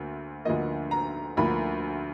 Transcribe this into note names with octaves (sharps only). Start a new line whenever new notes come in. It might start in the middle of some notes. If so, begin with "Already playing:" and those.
Already playing: D2 D3 A#3
D2 D3 F3 A#3 D#5
A#5
D2 D3 F3 A#3 B5